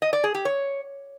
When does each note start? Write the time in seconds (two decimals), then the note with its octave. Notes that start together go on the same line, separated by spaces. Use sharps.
0.02 D#5
0.13 D5
0.24 G#4
0.34 G4
0.45 C#5